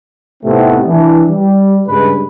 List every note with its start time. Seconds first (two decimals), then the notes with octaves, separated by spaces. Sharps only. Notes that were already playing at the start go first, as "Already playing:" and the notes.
0.44 A2 C3 A3 B3 C4 D#4
0.86 E3 D4
1.30 G3
1.87 G2 C#3 G#3 B4